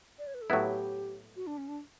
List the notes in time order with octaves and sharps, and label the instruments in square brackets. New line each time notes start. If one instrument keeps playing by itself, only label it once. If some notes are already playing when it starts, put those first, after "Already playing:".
[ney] D5
C#5
B4
A4
[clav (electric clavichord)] A2 F#3 B3 E4 [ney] G4
[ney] F#4
D4
C#4
D4